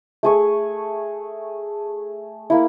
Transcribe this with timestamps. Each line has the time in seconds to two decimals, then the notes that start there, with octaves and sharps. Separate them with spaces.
0.23 A3 G#4 C#6
2.50 A#3 E4